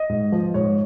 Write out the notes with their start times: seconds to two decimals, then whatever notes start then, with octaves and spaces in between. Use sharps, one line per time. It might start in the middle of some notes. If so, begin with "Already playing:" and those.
Already playing: D#5
0.09 G#2
0.32 F3
0.54 G#2 C#5